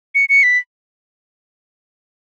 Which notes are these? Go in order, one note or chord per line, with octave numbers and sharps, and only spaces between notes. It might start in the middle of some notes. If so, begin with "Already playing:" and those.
C#7
C#7
B6